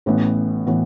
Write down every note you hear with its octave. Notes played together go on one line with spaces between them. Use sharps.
A1 A2 E3 B3
A2 E3 B3